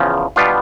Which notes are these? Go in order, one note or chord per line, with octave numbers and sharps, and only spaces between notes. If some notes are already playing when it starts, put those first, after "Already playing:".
Already playing: E2 C#3 F3
B2 G3 B3 D4 F4